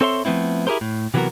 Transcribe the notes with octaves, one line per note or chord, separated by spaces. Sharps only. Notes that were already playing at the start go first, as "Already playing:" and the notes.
C4 A4 C#5 E5 C6
F3 A3 B3 C4 E4
E4 G4 G#4 A#4 C5
A2
C3 E3 F#3 B3 F#4 A#4